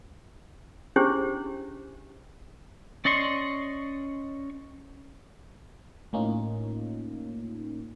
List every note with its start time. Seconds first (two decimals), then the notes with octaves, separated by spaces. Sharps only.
0.96 C#4 D4 E4 G4 G#4 C5
3.05 C#4 D5 D#5 C6 C#6
6.13 A2 A#3 C#4 D#4 F4